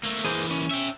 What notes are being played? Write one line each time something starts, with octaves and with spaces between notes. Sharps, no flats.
A3 A#3
E3 A#3 G#4 C5
C#4
E5 G5